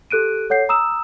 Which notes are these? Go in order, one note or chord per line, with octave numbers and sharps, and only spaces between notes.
G4 A4 F#6 D7 D#7
A4 C#5 F#5 G6 C7
A#5 D#6 E6 E7